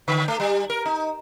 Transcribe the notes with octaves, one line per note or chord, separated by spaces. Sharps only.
D3
A3
G3
A#4
D#4